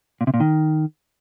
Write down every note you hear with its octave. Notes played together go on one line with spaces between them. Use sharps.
A#2
C3
A#2
D#3